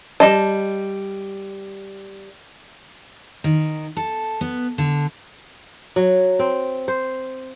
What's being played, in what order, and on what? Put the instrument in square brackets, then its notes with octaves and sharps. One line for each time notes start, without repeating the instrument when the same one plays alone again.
[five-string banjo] G3 D#5 A5
[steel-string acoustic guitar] D#3
A4
B3
D3
[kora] F#3
C4
C5